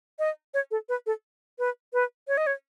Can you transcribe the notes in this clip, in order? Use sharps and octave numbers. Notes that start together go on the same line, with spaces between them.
D#5
C#5
A4
B4
A4
B4
B4
C#5
D#5
C#5